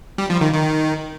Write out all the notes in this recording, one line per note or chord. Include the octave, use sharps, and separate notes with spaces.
G3
F3
D#3
D#3